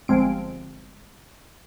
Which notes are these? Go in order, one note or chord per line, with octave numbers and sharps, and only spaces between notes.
G1 F3 G#3 C4 D7